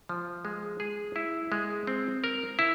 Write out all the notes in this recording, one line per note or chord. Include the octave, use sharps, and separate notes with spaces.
F3
G#3
G#4
E4
G#3
C4
A#4
E4